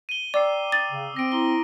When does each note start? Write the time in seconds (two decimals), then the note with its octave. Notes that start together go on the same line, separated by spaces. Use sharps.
0.09 D#7 G7
0.34 D5 G5 A#5 D6 E6 C7
0.72 D#6 A6
0.90 C#3
1.16 C4 A#6 D7
1.32 E4 A#5 C6 G7